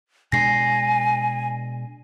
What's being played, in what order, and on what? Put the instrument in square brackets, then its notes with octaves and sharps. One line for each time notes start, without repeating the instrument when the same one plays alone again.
[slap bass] B2 G#3 D4 [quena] G#5 [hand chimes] A#6 C7